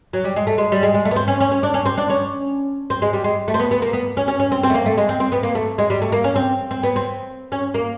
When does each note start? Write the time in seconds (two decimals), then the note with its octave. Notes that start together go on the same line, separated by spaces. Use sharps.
0.13 F#3
0.24 G3
0.36 G#3
0.47 A3
0.58 G#3
0.72 G3
0.83 G#3
0.94 G#3
1.05 A3
1.11 B3
1.16 C4
1.28 C#4
1.40 C#4
1.52 C#4
1.63 D4
1.74 C#4
1.85 C4
1.98 D4
2.10 C#4
2.90 C4
3.02 G#3
3.13 G3
3.24 G#3
3.48 A3
3.54 C4
3.60 B3
3.71 B3
3.82 A#3
3.93 B3
4.17 C#4
4.28 C#4
4.40 C#4
4.52 C4
4.63 C4
4.70 A3
4.74 A#3
4.86 A3
4.97 G#3
5.09 C4
5.20 C4
5.32 B3
5.43 A#3
5.55 A3
5.78 G#3
5.90 G3
6.02 A3
6.12 A#3
6.24 C#4
6.36 C4
6.71 C4
6.83 B3
6.96 C4
7.52 C#4
7.74 A#3